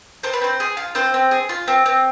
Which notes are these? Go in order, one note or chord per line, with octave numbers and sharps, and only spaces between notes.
C4 C5
B4
C4 C5
G#4
F4
C4 C5
C4
G#4
F4
C4
C4